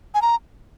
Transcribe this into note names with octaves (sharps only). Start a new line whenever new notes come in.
G#5
A#5